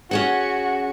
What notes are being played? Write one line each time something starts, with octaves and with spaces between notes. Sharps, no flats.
C#4 F#4 G#4 F#5